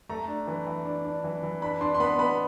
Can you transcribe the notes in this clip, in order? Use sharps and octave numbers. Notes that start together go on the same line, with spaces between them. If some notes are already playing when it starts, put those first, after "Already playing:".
A3 A#5
D4
E3
E3
D4
D4
E3
E3
D4 B5
D4 C6
C6
B3 B5
B3 B5